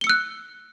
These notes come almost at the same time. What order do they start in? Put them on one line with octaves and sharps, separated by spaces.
G7 C#7 E6 F#6